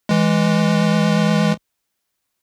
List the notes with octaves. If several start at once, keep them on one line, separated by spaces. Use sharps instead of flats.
E3 G#3